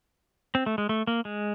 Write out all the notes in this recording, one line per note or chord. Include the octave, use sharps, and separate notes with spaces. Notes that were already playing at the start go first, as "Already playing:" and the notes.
C4
A3
G#3
A3
A#3
G#3